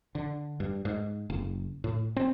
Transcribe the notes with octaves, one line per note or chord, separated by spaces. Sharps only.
D3
G2
G#2
F#1
A2
C4